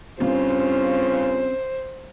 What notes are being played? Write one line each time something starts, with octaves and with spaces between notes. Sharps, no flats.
G2 C#3 C4 C#4 F4 C5